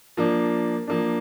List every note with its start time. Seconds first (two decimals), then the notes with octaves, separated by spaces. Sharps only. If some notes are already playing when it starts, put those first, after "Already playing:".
0.17 F3 A#3 D4
0.87 F3 A#3 D4